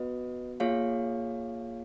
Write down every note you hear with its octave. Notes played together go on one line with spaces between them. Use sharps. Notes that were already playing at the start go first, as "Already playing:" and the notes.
Already playing: B3 F#4 B4 D#5
A#3 F4 G#4 C#5 F5